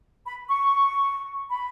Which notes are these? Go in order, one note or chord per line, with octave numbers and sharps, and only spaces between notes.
B5
C#6
B5